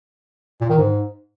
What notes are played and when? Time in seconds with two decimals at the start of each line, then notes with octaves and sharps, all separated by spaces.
0.61 A#2
0.70 D#3
0.78 G#2